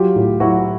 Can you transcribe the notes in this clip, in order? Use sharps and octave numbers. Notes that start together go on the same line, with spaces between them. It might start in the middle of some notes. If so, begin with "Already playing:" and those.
Already playing: F#3 F4 G4
A2
F#3 E4 F#4